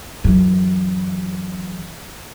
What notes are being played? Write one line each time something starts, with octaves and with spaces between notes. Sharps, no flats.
F#2 E3